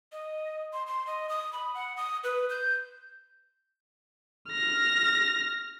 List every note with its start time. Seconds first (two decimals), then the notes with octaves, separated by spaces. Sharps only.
0.12 D#5
0.73 C6
0.87 C6
1.07 D#5
1.29 D#6
1.53 B5
1.74 F#5
1.97 D#6
2.24 B4
2.50 G6
4.49 F6 A#6